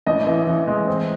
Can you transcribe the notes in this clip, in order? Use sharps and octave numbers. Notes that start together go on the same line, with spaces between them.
A1 D#5
E3
E3
G#3
C4